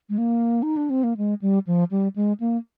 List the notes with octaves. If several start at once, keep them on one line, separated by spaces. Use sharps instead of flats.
G#3
A#3
D#4
D4
C4
A#3
G#3
G3
F3
G3
G#3
A#3